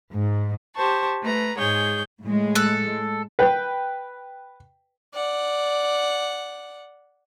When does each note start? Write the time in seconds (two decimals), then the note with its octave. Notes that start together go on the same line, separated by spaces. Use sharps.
0.14 G#2
0.75 G4 C5 A5 C#6
1.21 A3 B4 A#5
1.56 G#2 G#3 G#4 C#5 G6
2.22 A2 G#3
2.55 A4 F#6
3.39 B4 G5
5.14 D5 F#5